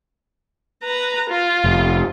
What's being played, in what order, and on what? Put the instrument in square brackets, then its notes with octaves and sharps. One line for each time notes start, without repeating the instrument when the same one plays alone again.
[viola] B4 A#5
F4
[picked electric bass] F1